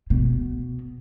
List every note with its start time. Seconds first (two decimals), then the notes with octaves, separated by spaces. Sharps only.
0.10 B2